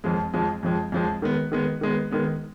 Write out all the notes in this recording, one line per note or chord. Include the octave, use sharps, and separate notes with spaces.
F2 F3 G#3
F2 F3 G#3
F2 F3 G#3
F2 F3 G#3
D#3 G#3 B3
D#3 G#3 B3
D#3 G#3 B3
D#3 G#3 B3